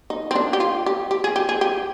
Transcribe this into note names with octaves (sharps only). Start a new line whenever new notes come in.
D#4
C4
D4
G4
F4
G4
G4
G#4
G4
G#4
G4